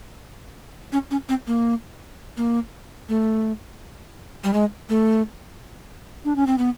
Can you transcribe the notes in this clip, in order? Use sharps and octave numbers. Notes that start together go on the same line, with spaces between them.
C#4
C#4
C4
A#3
A#3
A3
G3
G#3
A3
D4
C#4
C4
B3